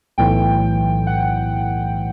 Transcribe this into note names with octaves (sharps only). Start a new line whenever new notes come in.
B1 A2 E3 G5
F#5